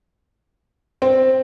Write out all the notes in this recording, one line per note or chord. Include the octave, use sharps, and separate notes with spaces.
C4